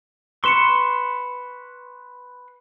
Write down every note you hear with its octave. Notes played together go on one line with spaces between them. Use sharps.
B4 C6 C#6 C#7 E7 G7